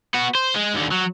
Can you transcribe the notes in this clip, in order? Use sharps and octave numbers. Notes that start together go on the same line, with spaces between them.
B3 F#4
C5
G#3
D#2 D3
F#3